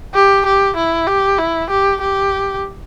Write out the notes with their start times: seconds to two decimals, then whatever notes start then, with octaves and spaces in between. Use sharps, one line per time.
0.15 G4
0.46 G4
0.76 E4
1.07 G4
1.38 E4
1.70 G4
2.01 G4